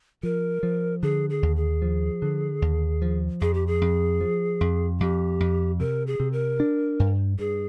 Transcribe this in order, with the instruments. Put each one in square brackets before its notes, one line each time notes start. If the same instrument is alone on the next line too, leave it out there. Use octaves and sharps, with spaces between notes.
[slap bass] F3 [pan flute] A#4
[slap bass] F3
[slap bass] D3 [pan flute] G#4
[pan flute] G#4
[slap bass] D#2
[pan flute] G#4
[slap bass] F3
D3
D#2
F3
[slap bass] F2 [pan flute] G#4
[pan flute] G4
G#4
[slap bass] F2
F3
F2
[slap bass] F2 [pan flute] G4
[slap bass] F2
[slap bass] C3 [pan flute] A#4
[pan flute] G#4
[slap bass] C3
[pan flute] A#4
[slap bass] D4
G2
[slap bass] G2 [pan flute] G#4